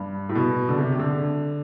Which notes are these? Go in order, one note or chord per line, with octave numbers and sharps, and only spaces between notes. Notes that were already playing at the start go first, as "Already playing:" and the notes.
Already playing: G2
A2
B2
D3
C3
C3
D3